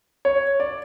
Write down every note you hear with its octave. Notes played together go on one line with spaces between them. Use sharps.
C#5
D5